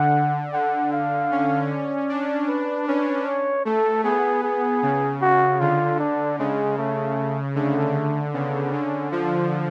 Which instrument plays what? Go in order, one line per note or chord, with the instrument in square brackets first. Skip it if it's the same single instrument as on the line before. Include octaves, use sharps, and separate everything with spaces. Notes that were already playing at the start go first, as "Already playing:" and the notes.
Already playing: [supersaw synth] D3 [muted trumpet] F#5
[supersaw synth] D3 [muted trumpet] F#5
[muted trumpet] F5
[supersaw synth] C#4
[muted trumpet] D5
[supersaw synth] D4
[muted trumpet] B4
[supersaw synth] C#4 [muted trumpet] B4
[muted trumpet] C#5
[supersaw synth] A3 [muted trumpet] A4
[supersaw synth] B3 [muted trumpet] G#4
[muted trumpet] G#4
[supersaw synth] C#3
[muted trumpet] F#4
[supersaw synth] D3 [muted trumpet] F4
[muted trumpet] D4
[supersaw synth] C#3 [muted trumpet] G#3
[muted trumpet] A3
[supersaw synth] D3 [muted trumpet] A3
[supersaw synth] C#3 [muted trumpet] B3
[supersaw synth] D3 [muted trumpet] C#4
[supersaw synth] F3 [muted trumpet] F4